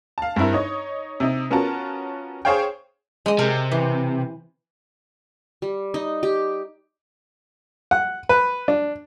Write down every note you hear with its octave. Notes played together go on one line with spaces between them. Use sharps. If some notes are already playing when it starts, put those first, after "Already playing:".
F5 A5
G2 C4 E4 A#4
D#4 C#5 D#5
C3 D#4
B3 C#4 F4 F#4 A#4 A5
G#4 C5 C#5 F5 G5
G#3 D#5
C3 A#4
E3
G3
D#4
G4
F#5
B4
D4